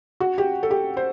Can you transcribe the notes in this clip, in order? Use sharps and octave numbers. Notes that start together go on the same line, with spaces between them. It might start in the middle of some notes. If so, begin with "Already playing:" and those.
F#4
G4
A4
G4
C5